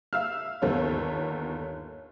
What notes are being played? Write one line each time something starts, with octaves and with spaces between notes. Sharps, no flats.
E5 F5 E6 F6
G1 D#2 B3 A4 C#5